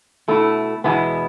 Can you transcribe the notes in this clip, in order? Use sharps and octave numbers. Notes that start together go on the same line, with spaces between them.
B2 A3 E4
E2 B2 G#3 B3 E4